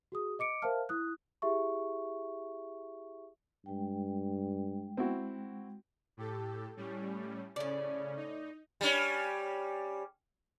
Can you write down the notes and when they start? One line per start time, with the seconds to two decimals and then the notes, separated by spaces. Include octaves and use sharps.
0.12 F#4 G#4 D#6
0.39 D#5 D6 C#7 D7
0.62 A#4 C5 E5 F5 A5 F6
0.89 E4 D#6 F#6
1.42 E4 G4 G#4 E5 C#6
3.66 G2 G#3 G5
4.97 C4 E4 F#4
6.17 A2 G4 A4
6.77 A2 G3 C#4
7.56 A2 C#3 C#4 D5
8.16 D#4
8.81 G3 C#4